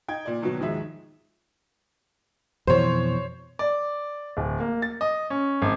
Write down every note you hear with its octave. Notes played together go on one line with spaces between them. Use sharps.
D#4 G5 G#6
A#2 D5
B1 B2 D#3 F#3
D#2 G#2 D#3 F3 G#3 E5
F2 B2 E3 C5 C#5
D5
D1
A#3
A6
D#5
C#4
G#1